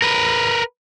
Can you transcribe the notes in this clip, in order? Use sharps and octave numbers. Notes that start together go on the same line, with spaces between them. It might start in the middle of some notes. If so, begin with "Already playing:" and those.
A#4 B4